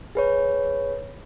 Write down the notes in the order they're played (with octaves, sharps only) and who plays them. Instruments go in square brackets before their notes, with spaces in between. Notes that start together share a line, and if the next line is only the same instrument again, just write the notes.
[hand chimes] G#4 B4 C#5